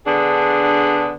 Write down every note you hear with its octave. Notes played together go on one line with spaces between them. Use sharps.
D3 B3 D4 G#4